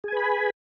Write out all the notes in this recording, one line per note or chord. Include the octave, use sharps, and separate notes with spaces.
G#4 B4 G#5 B5